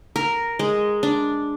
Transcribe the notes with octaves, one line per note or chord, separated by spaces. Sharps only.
A#4
G#3
D4